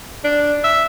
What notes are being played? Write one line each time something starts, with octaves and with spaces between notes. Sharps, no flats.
D4
E5